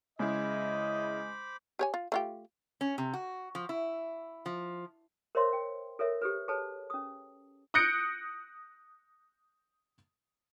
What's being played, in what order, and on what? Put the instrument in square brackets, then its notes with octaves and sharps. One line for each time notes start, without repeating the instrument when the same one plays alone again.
[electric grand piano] C#3 E4 [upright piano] G#3 [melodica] C5 B5 D6 [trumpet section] D#5
[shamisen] G4 C#5 G#5
F4
A3 F4 G4
[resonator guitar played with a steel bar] C#4
C3
F#4
F3
E4
F3
[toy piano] A#4 C5 C#5 D#5 E5 C6
G5
A4 A#4 C#5 E5
G4 A4 B4
G#4 A4 B4 C#5 A5
C#4 D#6
[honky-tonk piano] D#6 F#6 G6 A#6 C#7 D7